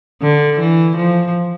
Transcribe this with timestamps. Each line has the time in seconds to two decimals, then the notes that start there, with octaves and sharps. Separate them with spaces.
0.23 D3
0.59 E3
0.97 F3